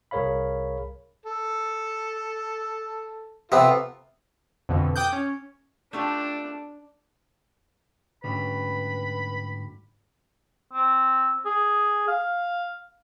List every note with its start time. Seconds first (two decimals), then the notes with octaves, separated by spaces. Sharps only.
0.11 C2 G#4 A#4 C#5 F5 B5
1.26 A4
3.52 C3 B3 F4 A4
4.69 F2 B2 D3
4.96 G5 D6 D#6 F#6 G6
5.13 C#4
5.93 A3 D4 F4 G4
8.24 D2 G#2 C#3 G3 B4 B5
10.73 C4
11.45 G#4
12.08 F5